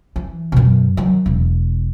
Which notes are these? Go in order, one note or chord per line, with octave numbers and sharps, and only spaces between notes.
E3
F#2 B2
D#3 F#3
E1